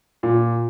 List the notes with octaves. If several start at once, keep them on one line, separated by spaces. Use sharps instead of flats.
A#2